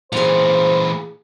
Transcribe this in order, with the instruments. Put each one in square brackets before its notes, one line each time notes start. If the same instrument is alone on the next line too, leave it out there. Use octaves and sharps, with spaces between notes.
[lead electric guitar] A#2 E3 [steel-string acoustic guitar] G#4 A#5 [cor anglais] C5